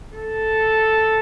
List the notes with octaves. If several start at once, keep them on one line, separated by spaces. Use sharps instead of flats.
A4